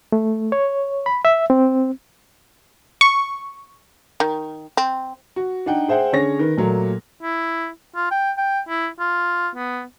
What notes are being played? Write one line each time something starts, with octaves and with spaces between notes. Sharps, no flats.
A3
C#5
B5
E5
C4
C#6
D#3
C4
F#4
D4 D#4 F#5 G5
G#4 C5 E5 F#5 G5
D3 C#4 G#4 C#5 A#6
D#3 B4
A#2 F#3 A3 A#3
E4
F4
G5
G5
E4
F4
B3